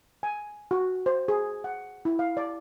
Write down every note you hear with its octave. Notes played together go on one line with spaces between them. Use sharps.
G#5
F#4
C5
G#4
F#5
E4
F5
D5